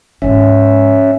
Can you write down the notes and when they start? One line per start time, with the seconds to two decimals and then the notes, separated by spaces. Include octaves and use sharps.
0.22 G#2 G#3 C#4 E5